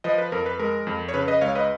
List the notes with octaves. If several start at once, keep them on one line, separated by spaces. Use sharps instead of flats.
F3 B4 D#5
B4
F2 A#4
B4
G#3 A#4
F2
C#5
C#3 B4
B4 D#5
C#2 C#5 F5
B4 D#5